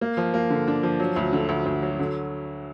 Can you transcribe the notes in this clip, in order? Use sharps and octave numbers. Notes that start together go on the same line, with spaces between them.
A#3
F3
A#3
D3
D4
F3
F#3
D2
D3
D2
D2
F#3
D3